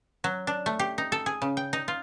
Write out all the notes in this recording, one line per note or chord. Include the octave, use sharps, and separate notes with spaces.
F#3
D4
A3
G4
D#4
A4
G#4
C#3
G5
D#4
F4